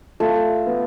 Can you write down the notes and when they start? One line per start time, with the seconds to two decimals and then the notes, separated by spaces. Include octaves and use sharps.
0.20 A3 F4
0.67 B3